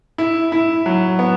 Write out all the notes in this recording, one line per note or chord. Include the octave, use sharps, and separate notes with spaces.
E4
E4
F#3
B3